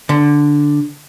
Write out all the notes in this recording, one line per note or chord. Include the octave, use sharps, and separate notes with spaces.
D3